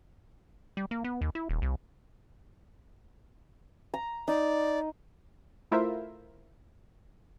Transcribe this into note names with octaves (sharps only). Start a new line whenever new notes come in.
G3
A#3
B3
D#2
E4
D#1
C2
A#5
D#4 D5
A3 E4 F4 A#4 C5 E5